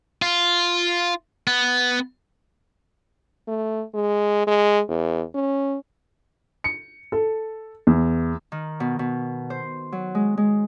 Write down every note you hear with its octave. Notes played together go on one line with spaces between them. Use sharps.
F4
B3
A3
G#3
G#3
E2
C#4
C#7
A4
E2
D#3
B2
B2
C5
F#3
G#3
G#3